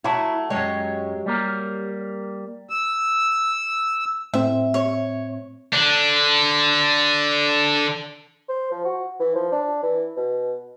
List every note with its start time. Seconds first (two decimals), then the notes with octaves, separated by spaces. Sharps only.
0.04 F#3 A3 E4 F#4
0.50 F#2 F#3 G#3 G4 C#5
1.26 G3 A#3 A#4
2.70 E6
4.34 A2 C4 E5
4.74 C#5
5.73 D3 D4
8.49 C5
8.72 F3
8.85 F#4
9.20 E3
9.35 F3
9.52 D4
9.83 E3
10.17 B2